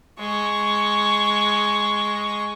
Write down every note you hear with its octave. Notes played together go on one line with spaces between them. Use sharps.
G#3 C#6